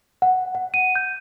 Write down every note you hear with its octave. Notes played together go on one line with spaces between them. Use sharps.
F#5
F#5
D#7
G6